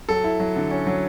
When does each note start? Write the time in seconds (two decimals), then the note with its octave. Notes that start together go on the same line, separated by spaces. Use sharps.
0.09 F#3 A4
0.24 E4
0.40 F#3
0.56 D3
0.71 C#4
0.87 F#3